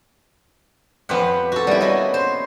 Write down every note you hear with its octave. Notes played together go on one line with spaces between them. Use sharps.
F2 B3 G4 C5 F#5 B5
F#4 A4
A#2 C#3 G3 B3 E4
F#4 D#5
C5